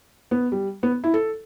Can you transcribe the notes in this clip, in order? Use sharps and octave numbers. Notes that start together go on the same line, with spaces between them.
B3
G3
B3
E4
A4